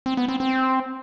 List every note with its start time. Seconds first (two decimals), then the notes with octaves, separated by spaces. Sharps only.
0.06 C4
0.17 B3
0.28 C4
0.40 C4